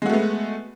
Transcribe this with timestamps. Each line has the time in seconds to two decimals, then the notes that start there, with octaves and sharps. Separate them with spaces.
0.02 G#3
0.06 F#4
0.10 A3
0.13 B3